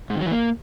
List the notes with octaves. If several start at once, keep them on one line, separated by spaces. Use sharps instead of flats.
G#2
D#3
F#3
E3
A#3